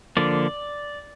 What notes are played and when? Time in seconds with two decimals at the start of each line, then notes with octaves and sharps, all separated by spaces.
0.17 D3 F3 A#3 D5